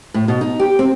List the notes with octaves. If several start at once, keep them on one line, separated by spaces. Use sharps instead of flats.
A2
B2
D#4
G4
C4